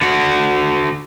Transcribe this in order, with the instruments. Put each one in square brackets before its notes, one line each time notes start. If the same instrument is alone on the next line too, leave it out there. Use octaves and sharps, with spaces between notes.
[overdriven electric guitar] D3 F#4